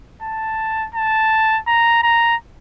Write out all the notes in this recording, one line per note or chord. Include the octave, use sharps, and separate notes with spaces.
A5
A5
A#5
A#5